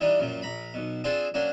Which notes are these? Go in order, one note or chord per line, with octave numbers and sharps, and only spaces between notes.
E3 G3 D4 D#4
F#2 A#2 F3
A#1 A#5 B5
B1 B2
C4 D4 F4 G#4 A4 C5
F#3 A#3 C#4 D4